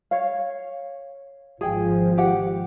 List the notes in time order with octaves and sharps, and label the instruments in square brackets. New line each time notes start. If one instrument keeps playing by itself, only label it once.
[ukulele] C#5 F5
[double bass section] G#1 F3 [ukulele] G#4 G5
[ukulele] G4 F#5